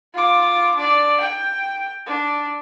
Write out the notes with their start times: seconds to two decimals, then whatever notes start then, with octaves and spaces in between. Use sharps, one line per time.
0.14 F4 D6
0.76 D4 D5
1.21 G5
2.06 D4